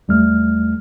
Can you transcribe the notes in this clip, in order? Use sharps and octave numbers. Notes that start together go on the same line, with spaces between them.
E2 G3 A3 F6